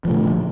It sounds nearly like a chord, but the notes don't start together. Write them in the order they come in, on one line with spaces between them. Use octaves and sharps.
F3 A3 A#2 D3